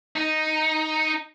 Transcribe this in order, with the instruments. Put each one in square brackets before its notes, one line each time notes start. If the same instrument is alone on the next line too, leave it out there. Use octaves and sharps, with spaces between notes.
[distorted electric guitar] D#4